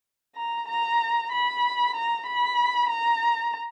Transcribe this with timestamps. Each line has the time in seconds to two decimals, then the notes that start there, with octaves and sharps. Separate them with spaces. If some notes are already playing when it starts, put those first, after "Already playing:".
0.36 A#5
0.68 A#5
1.32 B5
1.96 A#5
2.26 B5
2.90 A#5